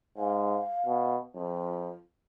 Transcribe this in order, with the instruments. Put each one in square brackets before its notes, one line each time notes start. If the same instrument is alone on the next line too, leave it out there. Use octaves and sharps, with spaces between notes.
[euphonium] G#2 [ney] F5
[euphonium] B2
[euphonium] F2 [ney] F4